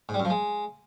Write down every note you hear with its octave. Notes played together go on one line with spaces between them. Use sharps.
G#2
G3
F#2
F3
G#3